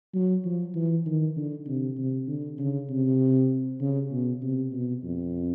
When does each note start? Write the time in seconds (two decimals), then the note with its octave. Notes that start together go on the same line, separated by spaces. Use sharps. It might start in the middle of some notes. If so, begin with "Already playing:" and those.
0.14 F#3
0.45 F3
0.75 E3
1.06 D#3
1.36 D3
1.68 C3
1.97 C3
2.28 D3
2.59 C#3
2.90 C3
3.81 C#3
4.12 B2
4.42 C3
4.73 B2
5.03 F2